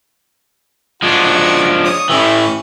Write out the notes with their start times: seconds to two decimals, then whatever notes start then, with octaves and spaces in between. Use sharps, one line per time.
1.02 F3 G#3 D4 F#4 F#5
1.84 C#5 D#6
2.09 A2 E3 C#4 E4 G4